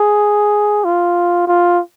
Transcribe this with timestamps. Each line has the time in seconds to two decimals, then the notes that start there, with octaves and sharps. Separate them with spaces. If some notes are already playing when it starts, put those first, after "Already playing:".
Already playing: G#4
0.84 F4
1.47 F4